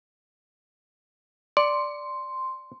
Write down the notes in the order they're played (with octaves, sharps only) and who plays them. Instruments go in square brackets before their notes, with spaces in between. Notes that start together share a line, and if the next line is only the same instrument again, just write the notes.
[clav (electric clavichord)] D5 [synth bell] C6